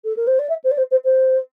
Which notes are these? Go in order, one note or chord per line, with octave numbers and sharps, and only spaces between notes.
A4
A#4
C5
D5
E5
C5
D5
C5
C5
C5